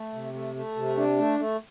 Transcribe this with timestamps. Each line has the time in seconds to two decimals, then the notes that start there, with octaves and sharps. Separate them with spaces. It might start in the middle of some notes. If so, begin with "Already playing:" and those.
Already playing: A3
0.12 C3
0.33 A3
0.55 A3
0.76 C3
0.97 D4
1.18 A3
1.39 A3